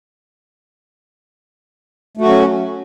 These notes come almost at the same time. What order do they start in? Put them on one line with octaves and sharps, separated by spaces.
A3 F#4 F#3 C#4